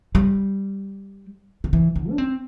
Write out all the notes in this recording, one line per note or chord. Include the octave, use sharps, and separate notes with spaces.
G3
D3
E3
D3
D4
C4